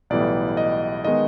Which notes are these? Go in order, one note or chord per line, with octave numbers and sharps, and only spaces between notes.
B1 A2 E3 G3 B3 D5
D#5
D#3 G#3 B3 D#5